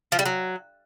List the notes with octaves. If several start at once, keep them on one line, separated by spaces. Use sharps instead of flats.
F3
G3
F#3